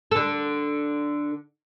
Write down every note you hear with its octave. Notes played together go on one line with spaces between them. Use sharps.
D3 A4